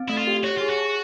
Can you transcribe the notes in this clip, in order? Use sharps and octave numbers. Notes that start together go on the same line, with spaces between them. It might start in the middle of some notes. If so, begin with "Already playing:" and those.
Already playing: C4
A3 E4
F4
G4
F#4 C#5
F4 G#4
F#4
A5